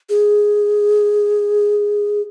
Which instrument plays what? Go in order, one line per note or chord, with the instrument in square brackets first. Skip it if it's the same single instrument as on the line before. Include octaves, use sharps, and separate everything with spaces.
[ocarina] G#4